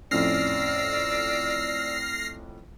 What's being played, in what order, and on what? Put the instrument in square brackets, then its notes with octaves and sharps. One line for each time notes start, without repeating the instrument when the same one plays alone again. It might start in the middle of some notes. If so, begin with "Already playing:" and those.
[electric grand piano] F2 A2 C#4 [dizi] D5 [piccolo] E6 [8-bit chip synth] F6 A#6 C7